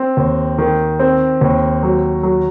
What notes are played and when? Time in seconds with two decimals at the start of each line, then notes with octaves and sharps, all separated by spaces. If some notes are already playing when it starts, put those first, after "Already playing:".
Already playing: C4
0.17 D#2
0.58 D#3
1.00 C4
1.41 D#2
1.83 F#3
2.23 F#3